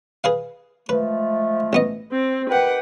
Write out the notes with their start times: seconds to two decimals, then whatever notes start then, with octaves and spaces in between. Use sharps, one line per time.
0.24 G#4 B4 F5
0.89 F3 G#3 A3 B4
1.73 A1 B3 D#5
2.12 C4
2.50 D#3 G4 B4 F#5 G5